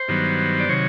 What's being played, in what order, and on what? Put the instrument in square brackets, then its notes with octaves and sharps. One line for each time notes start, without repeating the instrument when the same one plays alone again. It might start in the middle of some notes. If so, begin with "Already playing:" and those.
Already playing: [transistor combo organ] C5
G2 D#3 F#3 B3
D5
C3 D#3 F#3 C#5